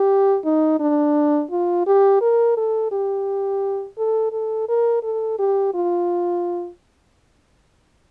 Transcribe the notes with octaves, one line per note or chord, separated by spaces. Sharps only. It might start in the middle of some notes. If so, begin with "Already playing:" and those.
Already playing: G4
D#4
D4
F4
G4
A#4
A4
G4
A4
A4
A#4
A4
G4
F4